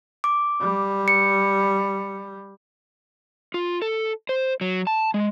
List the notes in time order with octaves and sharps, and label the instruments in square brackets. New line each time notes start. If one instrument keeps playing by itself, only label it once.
[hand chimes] D6
[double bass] G3
[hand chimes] C#7
[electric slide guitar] F4
A4
C5
F#3
A5
G#3